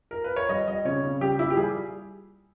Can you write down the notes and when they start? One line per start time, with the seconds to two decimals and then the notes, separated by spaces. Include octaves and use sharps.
0.11 A#4
0.24 B4
0.36 C#5
0.49 G3 D#5
0.67 G3 D#5
0.85 C#3 C#5
1.04 C#3
1.21 G3 G4
1.38 A#2 E4
1.50 G4
1.56 G3 G#4